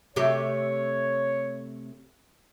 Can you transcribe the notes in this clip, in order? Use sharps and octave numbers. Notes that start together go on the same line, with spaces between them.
C3 A3 G4 C#5